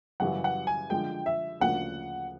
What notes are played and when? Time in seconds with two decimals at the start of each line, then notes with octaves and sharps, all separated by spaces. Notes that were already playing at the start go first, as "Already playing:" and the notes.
0.20 F#2 C#3 E3 G3 F#5
0.44 F#5
0.67 G#5
0.90 D3 F3 G#3 G5
1.26 E5
1.60 D2 C#3 F3 A#3 D4 F#5